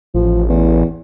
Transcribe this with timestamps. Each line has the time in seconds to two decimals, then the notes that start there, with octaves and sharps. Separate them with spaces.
0.14 A1 F3
0.49 E2